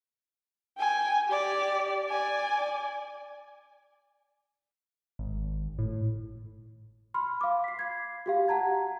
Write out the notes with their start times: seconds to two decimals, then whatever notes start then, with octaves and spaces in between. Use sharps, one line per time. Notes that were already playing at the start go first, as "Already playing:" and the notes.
0.78 G5 G#5
1.27 G4 D5
2.09 D5 G#5
5.19 G#1
5.79 A2
7.14 B5 C6 F6
7.41 F5 D6
7.64 B6 C7
7.79 G#6 C7
8.26 F#4 G4 F5
8.48 F#5 A5 A#5 G#6